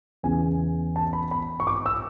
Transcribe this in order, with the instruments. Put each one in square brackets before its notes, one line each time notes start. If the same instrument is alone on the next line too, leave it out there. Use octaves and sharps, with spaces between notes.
[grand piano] E2 C#3 E3 B3 G#5
A5
B5
B5
C#6
D6
E6